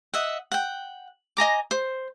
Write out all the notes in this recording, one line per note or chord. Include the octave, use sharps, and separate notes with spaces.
D#5 E5 F#5
F#5 G5
D#5 G#5 A#5 D6
C5